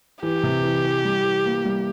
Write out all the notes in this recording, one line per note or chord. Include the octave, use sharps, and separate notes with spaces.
E3 G4
C3
E3
E3
G3
E3
A#3
G3